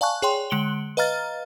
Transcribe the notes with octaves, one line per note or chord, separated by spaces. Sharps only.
D5 F5 G#5 A5 C#6 F#6
G#4 C#5 G5 C6
D3 G#3 C#7 D7 F#7 G7
B4 D#5 F5 A#5 F6 A6